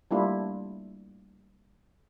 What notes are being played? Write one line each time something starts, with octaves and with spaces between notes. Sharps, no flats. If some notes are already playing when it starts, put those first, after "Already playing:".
G3 A3 A#3 D4 E4 F4